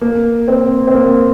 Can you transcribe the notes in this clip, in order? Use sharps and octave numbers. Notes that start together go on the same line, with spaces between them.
A#3
C4
C4
A#3